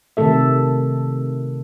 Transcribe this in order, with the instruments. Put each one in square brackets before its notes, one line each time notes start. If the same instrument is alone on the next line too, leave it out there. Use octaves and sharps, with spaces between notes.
[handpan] C3 D#3 A3 A4 E5